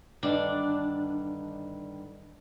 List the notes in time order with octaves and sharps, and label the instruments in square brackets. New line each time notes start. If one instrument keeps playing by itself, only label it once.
[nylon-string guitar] G2 D3 D#3 [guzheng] D4